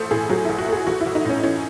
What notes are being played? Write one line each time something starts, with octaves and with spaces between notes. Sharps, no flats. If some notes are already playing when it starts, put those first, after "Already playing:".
Already playing: A1 A3 A4 C5
A2 G#4
F#3 G#4
A1 E4
F#4
A3 G#4
A1 F#4
E4
A1
D#4
A2 C#4
E3 C#4